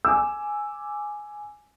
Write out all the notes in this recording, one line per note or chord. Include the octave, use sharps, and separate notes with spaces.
G#5 D6 E6